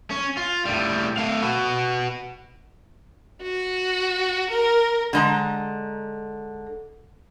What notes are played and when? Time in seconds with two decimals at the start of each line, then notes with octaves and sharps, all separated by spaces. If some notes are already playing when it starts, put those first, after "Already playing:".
0.10 C#4
0.37 F4
0.65 A2 G3
1.17 A3 F5
1.42 F#4 B4
3.42 F#4
4.50 A#4
5.13 D3 G#3 A#5